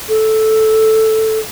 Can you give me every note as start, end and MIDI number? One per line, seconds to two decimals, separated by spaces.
0.08 1.39 69